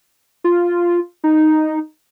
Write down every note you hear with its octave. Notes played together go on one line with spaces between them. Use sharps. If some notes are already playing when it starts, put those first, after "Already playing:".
F4
D#4